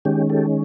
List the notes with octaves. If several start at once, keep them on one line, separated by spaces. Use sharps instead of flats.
D#3 G#3 C#4 G4
G4 A4